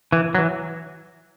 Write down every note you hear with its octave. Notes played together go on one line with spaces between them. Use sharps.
E3
F#3
E3